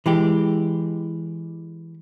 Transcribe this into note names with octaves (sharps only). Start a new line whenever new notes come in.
E3 G#3 G4